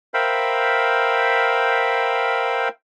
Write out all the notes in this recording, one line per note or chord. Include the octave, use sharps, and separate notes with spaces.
A#4 C5 E5 F5 G5 B5